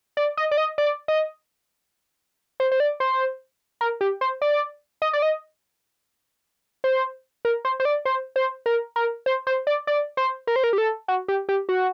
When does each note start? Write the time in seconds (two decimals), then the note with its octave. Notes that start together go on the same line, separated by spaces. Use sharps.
0.17 D5
0.37 D#5
0.51 D5
0.57 D#5
0.78 D5
1.08 D#5
2.60 C5
2.72 C5
2.80 D5
3.00 C5
3.81 A#4
4.01 G4
4.21 C5
4.42 D5
5.02 D#5
5.13 D5
5.22 D#5
6.84 C5
7.45 A#4
7.65 C5
7.80 C5
7.85 D5
8.05 C5
8.36 C5
8.66 A#4
8.96 A#4
9.26 C5
9.47 C5
9.67 D5
9.87 D5
10.17 C5
10.47 A#4
10.56 C5
10.64 A#4
10.73 G4
10.78 A4
11.08 F#4
11.28 G4
11.49 G4
11.69 F#4